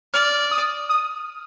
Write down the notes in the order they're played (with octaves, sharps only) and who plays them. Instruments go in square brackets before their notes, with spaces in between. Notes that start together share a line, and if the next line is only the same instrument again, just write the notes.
[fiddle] D5 [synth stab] F6
[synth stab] D#6
D#6